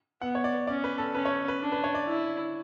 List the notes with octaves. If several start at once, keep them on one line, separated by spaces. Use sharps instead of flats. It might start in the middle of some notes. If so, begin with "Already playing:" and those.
B3 F#5
C#5
D5
C#4 D5
B4
A4
C#4 B4
C#5
B4
D4
B4
C#5
D5
E4